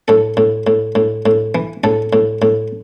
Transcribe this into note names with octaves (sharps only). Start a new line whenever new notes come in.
A2 A4
A2
A2
A2
A2
E3
A2 A4
A2
A2